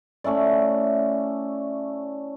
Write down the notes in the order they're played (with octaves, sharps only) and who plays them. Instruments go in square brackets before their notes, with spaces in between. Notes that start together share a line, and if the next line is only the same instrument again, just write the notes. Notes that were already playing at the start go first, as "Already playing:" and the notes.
[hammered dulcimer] A3 C#4 E4 D5